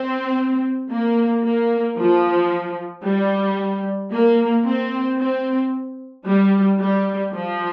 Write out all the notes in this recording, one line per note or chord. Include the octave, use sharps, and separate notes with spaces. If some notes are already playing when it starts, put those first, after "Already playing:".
Already playing: C4
A#3
A#3
F3
G3
A#3
C4
C4
G3
G3
F3